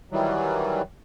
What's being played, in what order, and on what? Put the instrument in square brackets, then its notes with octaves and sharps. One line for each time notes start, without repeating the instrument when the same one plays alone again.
[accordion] D#3 E3 F#3 G3